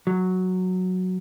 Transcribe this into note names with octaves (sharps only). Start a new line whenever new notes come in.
F#3